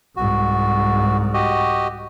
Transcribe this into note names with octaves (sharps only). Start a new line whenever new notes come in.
C2 G#2 F#4
F#4 G4 D#5